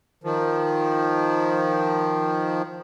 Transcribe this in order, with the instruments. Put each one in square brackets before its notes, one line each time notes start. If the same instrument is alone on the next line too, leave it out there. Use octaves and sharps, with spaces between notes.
[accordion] D#3 F3